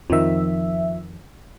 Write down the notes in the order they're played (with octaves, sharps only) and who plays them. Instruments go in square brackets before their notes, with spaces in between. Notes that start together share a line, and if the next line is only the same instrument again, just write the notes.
[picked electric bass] F2 D#3 [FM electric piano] F3 E5